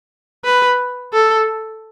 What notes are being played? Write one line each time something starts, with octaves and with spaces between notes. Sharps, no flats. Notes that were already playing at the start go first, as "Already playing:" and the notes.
B4
A4